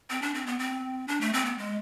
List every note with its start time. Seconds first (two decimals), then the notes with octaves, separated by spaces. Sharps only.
0.10 C4
0.22 D4
0.34 C4
0.46 B3
0.59 C4
1.08 D4
1.21 A3
1.33 C4
1.45 B3
1.58 G#3